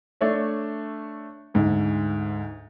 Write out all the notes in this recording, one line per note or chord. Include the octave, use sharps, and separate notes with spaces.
A3 D4 C#5 E5
D2 G#2